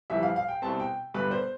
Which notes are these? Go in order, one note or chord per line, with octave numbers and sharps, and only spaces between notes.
G1 F2 E3 G3 E5
F5
F5
G5
C2 B2 G3 C4 A5
G5
G1 G2 D3 G3 B3 B4
C5